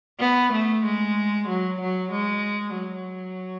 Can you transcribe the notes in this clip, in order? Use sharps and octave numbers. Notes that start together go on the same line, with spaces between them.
B3
A3
G#3
F#3
F#3
G#3
F#3